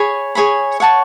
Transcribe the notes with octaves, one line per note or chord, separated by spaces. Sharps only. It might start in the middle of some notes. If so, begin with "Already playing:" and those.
Already playing: G#4 C#5 G#5 B5
G#4 C#5 G#5 B5
C#5 F#5 A5 C#6